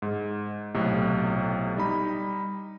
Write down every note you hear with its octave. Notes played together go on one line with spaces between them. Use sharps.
G#2
B1 A2 C3
G3 D#4 B5